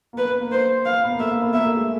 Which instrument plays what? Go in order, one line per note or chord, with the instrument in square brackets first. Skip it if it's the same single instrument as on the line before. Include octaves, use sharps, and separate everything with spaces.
[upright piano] A#3
[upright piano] B3 [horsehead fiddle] B4
[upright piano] B3
A#3
[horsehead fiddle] C5
F5
[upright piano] B3
A#3
[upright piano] A3 [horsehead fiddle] E5
[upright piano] A#3
B3
[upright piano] A#3 [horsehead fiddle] E5
[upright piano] A3
G#3